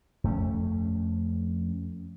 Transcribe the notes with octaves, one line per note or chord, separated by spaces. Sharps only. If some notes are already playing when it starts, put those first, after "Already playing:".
F2 A3 C#4